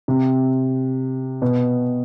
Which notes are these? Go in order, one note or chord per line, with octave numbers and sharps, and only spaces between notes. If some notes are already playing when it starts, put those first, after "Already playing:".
C3
B2